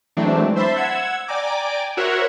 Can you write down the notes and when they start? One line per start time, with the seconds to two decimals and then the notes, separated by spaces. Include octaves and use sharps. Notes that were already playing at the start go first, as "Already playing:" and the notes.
0.17 E3 F#3 G#3 A3 C4 D4
0.56 C5 E5 A5 B5 C6
0.76 F#5 E6 G#6
1.28 D5 G5 G#5 A#5 D6
1.97 F#4 A#4 C5 C#5 E5 F#5